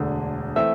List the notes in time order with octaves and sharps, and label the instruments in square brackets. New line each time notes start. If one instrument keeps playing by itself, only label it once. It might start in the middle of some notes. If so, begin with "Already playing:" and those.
Already playing: [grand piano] E1 D2 D3
[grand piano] E3 A3 C4 [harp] E5